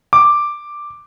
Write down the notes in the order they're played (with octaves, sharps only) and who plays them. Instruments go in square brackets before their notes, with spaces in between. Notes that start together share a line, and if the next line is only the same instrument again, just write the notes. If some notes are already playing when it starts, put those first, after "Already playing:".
[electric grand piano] D6